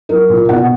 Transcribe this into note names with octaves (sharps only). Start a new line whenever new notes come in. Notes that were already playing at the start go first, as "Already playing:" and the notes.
F#3 A#4
A#2
B2 F#5